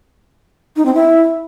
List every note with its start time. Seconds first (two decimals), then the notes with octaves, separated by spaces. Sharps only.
0.76 D#4
0.86 C4
0.95 E4